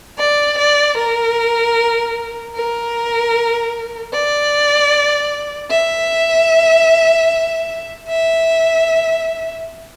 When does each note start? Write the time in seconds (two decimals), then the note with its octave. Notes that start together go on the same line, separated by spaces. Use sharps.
0.19 D5
0.58 D5
0.97 A#4
2.55 A#4
4.13 D5
5.71 E5
8.08 E5